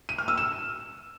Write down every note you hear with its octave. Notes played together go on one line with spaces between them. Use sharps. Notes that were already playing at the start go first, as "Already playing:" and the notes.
D#7
F6
E6
E7